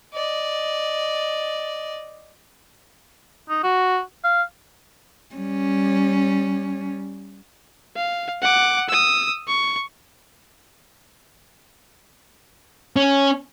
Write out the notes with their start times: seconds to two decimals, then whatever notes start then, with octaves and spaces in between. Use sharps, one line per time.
0.14 D5 D#5
3.49 D#4
3.64 F#4
4.24 F5
5.35 G3 C#4
7.96 F5
8.42 F#5 D6
8.89 D#6 E6
9.47 C#6
12.96 C#4